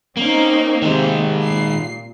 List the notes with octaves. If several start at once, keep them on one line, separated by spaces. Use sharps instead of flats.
A#3 C4 C#4 D#4
C3 D#3 G#3 A#3
A#2 C7